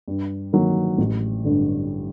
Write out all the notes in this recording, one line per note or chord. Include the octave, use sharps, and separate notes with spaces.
G2
D#3 F#3 A#3
A1
G2 D3